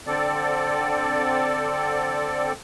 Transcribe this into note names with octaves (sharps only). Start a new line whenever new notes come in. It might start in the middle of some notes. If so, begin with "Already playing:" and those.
D3 C4 A4 D5